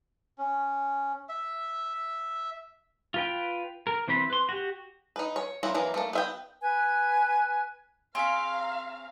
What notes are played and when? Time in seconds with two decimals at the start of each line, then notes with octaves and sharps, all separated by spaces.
0.38 C#4
1.29 E5
3.14 F4 B4 G5
3.87 A#4
4.08 E3 C4 C5 B5
4.30 B4 C6
4.49 F#4 G4
5.16 D#4 B4
5.36 C#5
5.63 F#3 A#3 C4 E4 F#4
5.74 E3 F#3 A#3
5.94 A3 A#3
6.13 B3 E5 G5
6.60 B4 G#5
8.15 C4 G#4 C#5 F5 A#5 C6 B6